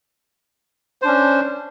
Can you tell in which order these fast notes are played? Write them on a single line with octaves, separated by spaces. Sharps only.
C5 D4 C#4